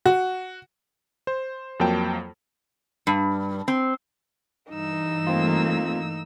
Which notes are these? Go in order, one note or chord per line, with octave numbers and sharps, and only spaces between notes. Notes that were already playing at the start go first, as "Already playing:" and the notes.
F#4
C5
F2 F#3 A#3 G5 A5
G2
C4
G2 E3 D#4 E6
A3 A#3 C4 F4